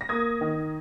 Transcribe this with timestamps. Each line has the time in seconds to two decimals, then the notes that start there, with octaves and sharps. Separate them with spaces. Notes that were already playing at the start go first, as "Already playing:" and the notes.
0.01 A#6
0.09 A#3 D#6 G#6
0.41 D#3